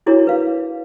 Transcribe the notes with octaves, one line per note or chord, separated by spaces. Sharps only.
D4 E4 F#4 G#4 A#4 C#5
B4 F5